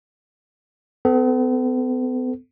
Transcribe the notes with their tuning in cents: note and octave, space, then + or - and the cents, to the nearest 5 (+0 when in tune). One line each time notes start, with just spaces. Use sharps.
B3 +45 A4 +0